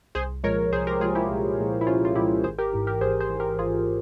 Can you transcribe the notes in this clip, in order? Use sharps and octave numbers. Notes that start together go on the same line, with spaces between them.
C2 G#4 C5
A#2 F3 G#3 A#4 C#5
C2 G#4 C5
G4 A#4
A#2 F3 G#3 F4 G#4
E4 G4
C2
A#2 F3 G#3
E4
C2 C#4 F4
F4
A#2 F3 G#3 E4 G4
G#1 G#4 C5
G4 A#4
G#2 E3
G4 A#4
G#1 G#4 C5
G#4 C5
G#2 E3
G4 A#4
G#1 F4 G#4